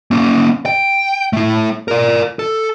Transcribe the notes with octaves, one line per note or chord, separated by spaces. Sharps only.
A#3 C#4
G5
A3 E4
A#4 D5
A4